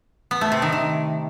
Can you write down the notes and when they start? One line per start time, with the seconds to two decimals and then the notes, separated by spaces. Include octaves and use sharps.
0.31 B3
0.41 A3
0.52 C3
0.62 D#3
0.72 D#3